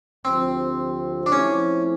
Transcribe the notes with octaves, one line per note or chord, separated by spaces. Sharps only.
D2 C3 F3 C4
D4
F3 A3 C4 C#4 E4